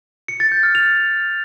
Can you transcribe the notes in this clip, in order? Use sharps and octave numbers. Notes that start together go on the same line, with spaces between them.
C#7
A6
G6
F6
F7